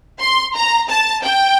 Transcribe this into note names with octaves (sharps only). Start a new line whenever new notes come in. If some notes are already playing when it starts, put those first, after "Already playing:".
C6
A#5
A5
G5